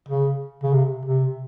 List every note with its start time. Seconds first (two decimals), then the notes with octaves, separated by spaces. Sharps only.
0.09 C#3
0.64 C#3
0.74 C3
1.06 C3